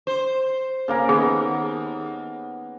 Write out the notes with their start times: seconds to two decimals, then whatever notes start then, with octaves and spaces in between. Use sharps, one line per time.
0.07 C5
0.88 C#3 A#3 A#4
1.09 D#2 B3 G#4